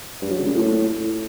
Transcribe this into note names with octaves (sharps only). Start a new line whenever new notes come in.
G2
F#3
C#3
A#2
A2